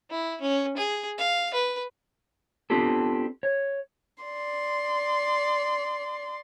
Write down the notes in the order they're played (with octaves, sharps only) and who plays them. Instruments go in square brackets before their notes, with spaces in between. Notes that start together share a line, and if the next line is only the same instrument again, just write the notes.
[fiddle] E4
C#4
G#4
F5
B4
[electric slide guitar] B3 C4 D4 F4 G4 A4
C#5
[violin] D5 C6